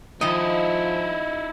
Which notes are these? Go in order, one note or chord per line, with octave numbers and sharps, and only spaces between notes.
G#2 D#3 F3 D#4 E4 D#5